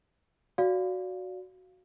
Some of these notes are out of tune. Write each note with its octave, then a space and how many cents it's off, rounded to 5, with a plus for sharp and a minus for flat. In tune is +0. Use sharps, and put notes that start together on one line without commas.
F#4 +0 D5 -25 F5 +0